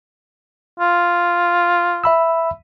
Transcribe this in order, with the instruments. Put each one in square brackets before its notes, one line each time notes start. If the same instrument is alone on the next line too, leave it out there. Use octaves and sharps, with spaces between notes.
[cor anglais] F4
[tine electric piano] E5 B5 E6